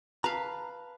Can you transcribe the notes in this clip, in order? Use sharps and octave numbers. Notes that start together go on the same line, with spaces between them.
B4 F5 A5 A#5